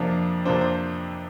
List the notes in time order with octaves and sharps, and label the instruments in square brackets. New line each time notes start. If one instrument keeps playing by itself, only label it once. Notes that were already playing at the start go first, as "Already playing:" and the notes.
Already playing: [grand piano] F2 C3 F3 A#3 D4
F2 C3 F3 A#3 D4 C5
C5